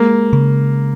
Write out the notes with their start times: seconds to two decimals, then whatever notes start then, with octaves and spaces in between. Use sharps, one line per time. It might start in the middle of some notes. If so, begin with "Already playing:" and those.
Already playing: G#3 A#3
0.33 C#3